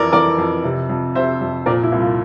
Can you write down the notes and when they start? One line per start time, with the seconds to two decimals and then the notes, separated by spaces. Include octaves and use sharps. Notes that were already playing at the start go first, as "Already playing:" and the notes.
Already playing: F2 E3 A#4 D5
0.12 E3 A#4 D5
0.38 F2
0.64 C3
0.89 F2
1.15 C3 C5 E5
1.41 F2
1.66 A#2 A#4 D5
1.83 E4
1.92 C2
2.00 F4